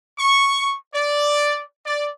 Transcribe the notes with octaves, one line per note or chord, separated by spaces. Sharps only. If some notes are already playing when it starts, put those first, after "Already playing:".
C#6
D5
D5